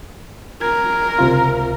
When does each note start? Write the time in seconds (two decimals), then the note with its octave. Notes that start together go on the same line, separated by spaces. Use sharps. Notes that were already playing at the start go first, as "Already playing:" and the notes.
0.61 A#4 G#6
1.19 C#2 C3 F4